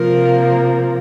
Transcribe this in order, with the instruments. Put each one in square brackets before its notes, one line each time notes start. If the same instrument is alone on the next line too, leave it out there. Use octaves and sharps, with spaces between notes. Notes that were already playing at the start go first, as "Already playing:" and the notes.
Already playing: [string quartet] C3 F3 A#3 A#4